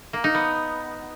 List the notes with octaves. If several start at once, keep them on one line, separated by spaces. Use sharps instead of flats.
A#3
D#4
B3